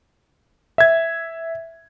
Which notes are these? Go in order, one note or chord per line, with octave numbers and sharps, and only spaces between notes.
E5 G#6